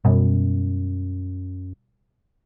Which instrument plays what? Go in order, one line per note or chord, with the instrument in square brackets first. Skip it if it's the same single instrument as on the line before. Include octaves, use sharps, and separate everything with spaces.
[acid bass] F#2 [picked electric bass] B2 G3